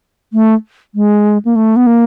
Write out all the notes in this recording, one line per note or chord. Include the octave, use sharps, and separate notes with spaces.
A3
G#3
A#3
A3
B3
A#3